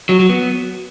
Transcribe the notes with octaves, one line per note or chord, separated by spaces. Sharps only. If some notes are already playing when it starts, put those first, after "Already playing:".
F#3
F#3
B3